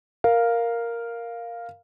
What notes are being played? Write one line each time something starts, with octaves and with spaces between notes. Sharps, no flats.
A#4 F5